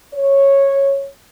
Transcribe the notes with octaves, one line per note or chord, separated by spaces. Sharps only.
C#5